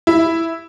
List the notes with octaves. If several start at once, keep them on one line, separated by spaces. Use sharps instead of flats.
E4